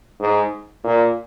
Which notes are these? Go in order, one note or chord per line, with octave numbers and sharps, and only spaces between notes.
G#2
A#2